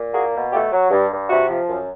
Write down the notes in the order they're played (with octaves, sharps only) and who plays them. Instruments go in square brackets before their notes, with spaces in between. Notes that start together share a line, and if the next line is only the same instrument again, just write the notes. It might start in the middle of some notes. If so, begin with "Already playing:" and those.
Already playing: [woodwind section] A#2
A#3 F#4 G#4
B2
A3 F4 G4
F#3
G2
G2
C3 E4 F#4
F3
F#2